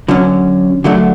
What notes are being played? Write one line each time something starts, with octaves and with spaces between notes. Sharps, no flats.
D3 F#3 C#4
D3 F#3 A3 D4